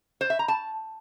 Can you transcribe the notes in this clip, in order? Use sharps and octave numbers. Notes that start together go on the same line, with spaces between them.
C5
E5
A#5
A5